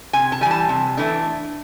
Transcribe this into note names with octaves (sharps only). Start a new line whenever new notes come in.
C3 G#5
A5
E3 G3 G#5
A5
C3
E3 A3 D4